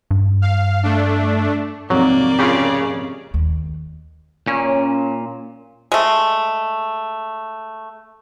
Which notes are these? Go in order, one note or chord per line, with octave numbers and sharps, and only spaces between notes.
G2
F5
A3 D4
F2 G#2 C3 F#3 A#3 D5
C#3 F4 G4
D#2
A#2 C#4
G#3 A3